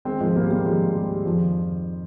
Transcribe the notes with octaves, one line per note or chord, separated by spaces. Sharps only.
D#3 G#3 C4
G#2 F3 G#3
G#2 G3 A#3
D#3 G3 A#3
D#3 F3 G#3
G#2
G#2 G3
D#3
F2 F3
D#3